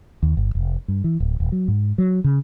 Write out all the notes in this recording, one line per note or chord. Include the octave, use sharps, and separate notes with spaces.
D#2
G1
F1
G2
E3
D1
D#1
F#3
G#2
F#3
C#3